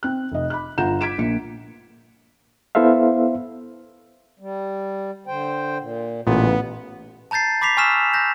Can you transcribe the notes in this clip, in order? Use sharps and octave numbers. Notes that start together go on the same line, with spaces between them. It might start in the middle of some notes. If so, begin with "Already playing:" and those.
C4 F#6
F1 D#5
B5 D6 F#6
G1 F4 F#5 A#5 G6 E7
D6 G#6 B6 D7 E7
A#1 A#3 C#7
B3 E4 A4 C5 E5 F5
G3
D3 C5 G5
A#2
A1 A#2 C#3 B3
A5 A#5 G6 A6 C7
B5 D6 B6 C7 F7
G#5 C#6 E6 F6 B6 E7
G6 A#6